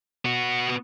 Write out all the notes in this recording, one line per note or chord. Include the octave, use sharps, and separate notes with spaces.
B3 F#4